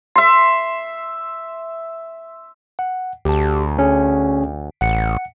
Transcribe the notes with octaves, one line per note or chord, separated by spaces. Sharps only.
E5 C6
F#5
D2 G4 A5
D3 C#4 G#4
A1 F#5 C#7